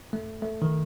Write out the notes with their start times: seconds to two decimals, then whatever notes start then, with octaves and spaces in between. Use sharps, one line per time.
0.13 A3
0.42 A3
0.62 D#3